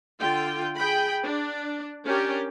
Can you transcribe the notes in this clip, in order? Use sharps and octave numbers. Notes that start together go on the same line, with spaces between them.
D3 F4 G5
G#4 G5 B5
D4
C#4 D4 G4 A#4